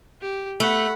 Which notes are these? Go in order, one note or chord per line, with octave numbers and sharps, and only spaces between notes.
G4
A3 F#5 B5